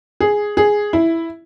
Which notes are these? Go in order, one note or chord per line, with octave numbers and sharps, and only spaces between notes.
G#4
G#4
E4